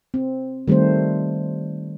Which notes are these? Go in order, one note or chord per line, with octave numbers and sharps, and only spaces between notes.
C4
D#3 G3 A3 C4 C5